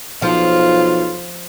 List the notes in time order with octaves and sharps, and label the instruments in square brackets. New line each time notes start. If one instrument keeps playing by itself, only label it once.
[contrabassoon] B1 [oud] F3 [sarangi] F4